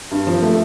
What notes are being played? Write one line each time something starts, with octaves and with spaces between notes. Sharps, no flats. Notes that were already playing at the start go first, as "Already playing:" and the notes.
G2
F3
A3